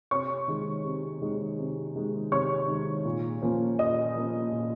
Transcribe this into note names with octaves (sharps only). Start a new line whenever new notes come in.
C3 C#5 C#6
D#3 G#3
C3
D#3 G#3
C3
D#3 G#3
C3 C#5 C#6
D#3 G#3
A#2
F3 A#3 C#4
A#2 D#5 D#6
F3 A#3 C#4
A#2